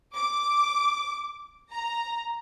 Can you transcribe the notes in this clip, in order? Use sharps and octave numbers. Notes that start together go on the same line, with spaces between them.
D6
A#5